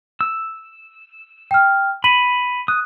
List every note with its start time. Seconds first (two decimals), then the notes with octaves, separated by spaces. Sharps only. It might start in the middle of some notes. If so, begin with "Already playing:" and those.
0.21 E6
1.51 G5 F6
2.04 B5 B6 D#7 F#7
2.68 D#6 F#6